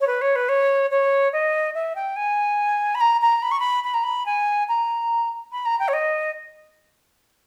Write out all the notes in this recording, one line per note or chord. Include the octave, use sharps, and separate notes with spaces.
C#5
B4
C#5
B4
C#5
C#5
D#5
E5
G5
G#5
B5
A#5
A#5
B5
C#6
B5
B5
A#5
B5
G#5
A#5
B5
A#5
G5
C#5
D#5